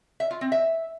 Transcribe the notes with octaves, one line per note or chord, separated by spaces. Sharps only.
E5
F4
C4
E5